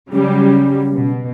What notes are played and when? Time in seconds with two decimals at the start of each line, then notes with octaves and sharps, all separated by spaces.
0.12 C#3 F#3 G3 C#4
0.96 B2